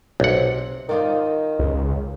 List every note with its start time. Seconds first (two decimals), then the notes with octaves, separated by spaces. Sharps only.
0.20 B1 C3 F#5
0.89 D#3 D#4 F4 D5
1.59 C#2